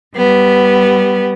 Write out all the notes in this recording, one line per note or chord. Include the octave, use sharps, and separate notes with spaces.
G3 B3